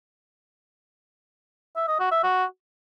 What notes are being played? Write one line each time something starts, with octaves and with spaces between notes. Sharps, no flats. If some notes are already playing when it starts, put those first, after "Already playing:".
E5
D#5
F#4
E5
F#4